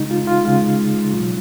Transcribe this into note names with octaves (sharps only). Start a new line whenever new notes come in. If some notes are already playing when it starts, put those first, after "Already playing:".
Already playing: C#3 G#3 D#4
F4
F4
C#3 G#3 F4
B2 F#3